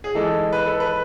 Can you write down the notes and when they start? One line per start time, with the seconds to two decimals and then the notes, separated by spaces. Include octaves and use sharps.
0.04 G#4
0.15 E3 G#3 D#4 A4
0.53 B4
0.66 A4
0.80 B4